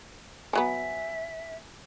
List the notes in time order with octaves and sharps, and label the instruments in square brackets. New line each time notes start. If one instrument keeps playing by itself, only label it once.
[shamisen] F3 F#3 B3 [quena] E5 [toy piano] G#5